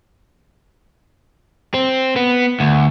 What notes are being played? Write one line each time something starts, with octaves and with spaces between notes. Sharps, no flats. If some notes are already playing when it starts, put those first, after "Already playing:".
C4
B3
D2